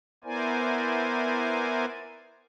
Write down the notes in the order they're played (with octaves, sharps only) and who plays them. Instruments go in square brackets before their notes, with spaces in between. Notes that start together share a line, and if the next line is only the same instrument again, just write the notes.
[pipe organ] B3 E4 A#4 C5 D5 G#5